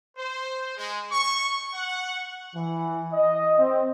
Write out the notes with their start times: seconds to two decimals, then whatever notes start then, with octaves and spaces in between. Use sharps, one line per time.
0.17 C5
0.77 G#3
1.11 C#6
1.74 F#5
2.56 E3
3.13 D#5
3.59 C4